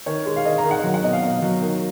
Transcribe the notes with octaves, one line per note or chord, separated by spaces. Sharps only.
D#3 C#5
G#3
F5
D#3 D#5
A#5
D#3
F#5
F#3
F#5
B2 D#5
F5
B2
F#3
D#3